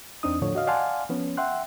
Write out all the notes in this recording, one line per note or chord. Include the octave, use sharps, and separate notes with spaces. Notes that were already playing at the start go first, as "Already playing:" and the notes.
E2 C4 D4 D#4 D#6
A2 D3 F3 C#5
F#4 D#5 F5
D5 F5 F#5 G#5 A5 C6
F3 B3 C#4
E5 F#5 G5 C6 F#6